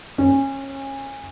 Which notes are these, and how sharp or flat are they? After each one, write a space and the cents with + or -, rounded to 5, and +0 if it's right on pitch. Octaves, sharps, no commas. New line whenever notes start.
C#4 -25